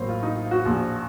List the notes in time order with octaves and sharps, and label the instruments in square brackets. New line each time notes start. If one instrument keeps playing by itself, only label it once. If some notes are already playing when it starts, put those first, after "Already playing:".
Already playing: [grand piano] A1 A2 F#3 A#3 C5 C#5
F4
D#4
F4
F#4
A#1 A#2 F3